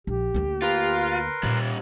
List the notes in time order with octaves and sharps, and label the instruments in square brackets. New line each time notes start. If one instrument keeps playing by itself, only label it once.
[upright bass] A#1 [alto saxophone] G4
[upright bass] D2 A#3
[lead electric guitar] F4 [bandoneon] A#4 B4 C6
[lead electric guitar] D#2 G3 [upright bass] A#2